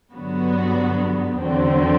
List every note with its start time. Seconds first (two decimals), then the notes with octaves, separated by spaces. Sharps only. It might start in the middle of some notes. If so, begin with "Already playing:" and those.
0.14 G2 D3 F#3 B3 F#4
1.38 E2 D3 F#3 C4